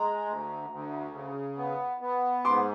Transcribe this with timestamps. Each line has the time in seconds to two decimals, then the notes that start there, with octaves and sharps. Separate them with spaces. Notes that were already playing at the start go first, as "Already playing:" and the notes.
Already playing: G#3 A#5
0.26 D2
0.70 D2
1.13 C#3
1.57 B3
2.01 B3
2.45 G#2 C6 D6